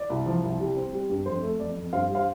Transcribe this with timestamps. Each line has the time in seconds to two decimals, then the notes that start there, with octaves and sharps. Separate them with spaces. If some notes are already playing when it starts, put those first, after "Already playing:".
Already playing: D5
0.10 C2
0.26 F3
0.44 C2
0.60 G3
0.77 C4
0.93 G3
1.10 G2
1.26 F2 C5
1.42 A3
1.59 F2 D5
1.76 F2
1.93 G2 C5 F5
2.09 G3
2.15 C5 F5